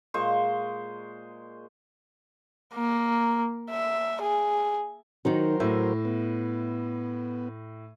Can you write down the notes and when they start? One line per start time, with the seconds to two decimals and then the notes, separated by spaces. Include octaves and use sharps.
0.14 A#2 G#3 C5 C#6
2.74 A#3
3.70 E5
4.22 G#4
5.25 D#3 F#3 D#4 F#4 A#4 C5
5.60 A2 E5
6.05 B3